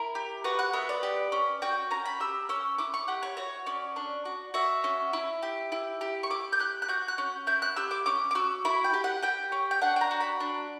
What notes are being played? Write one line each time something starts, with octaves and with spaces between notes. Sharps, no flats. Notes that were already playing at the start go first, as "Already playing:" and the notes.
Already playing: E4 A#4
G4
F#4 B4
F#5
B3 E5
D5
G4
C#4
F#4 G5
C#4 A#5
B5
G4 E6
C#4 E6
E4 D6
C#6
G4 F#5
C#5
F#4 C#5
C#4 D5
D4
F#4
F#4 E5
C#4
E4
G4
E4
G4
C#6
E4 D6
G6
G4 F#6
F#6
F#4 G6
F#6
C#4
E4 G6
F#6
G4 E6
D6
C#4 D6
D6
F#4 E6
E4 B5
G5
G4
F#5
G4 G5
C#4
G5
D4 F#5
G5
A#5
F#4
B5
D4